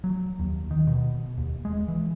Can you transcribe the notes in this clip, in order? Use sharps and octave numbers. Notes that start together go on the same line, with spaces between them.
F#3
D#2
D#3
B2
D#2
G#3
E3